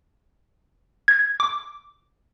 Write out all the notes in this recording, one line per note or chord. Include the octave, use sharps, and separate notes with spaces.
G#6
D6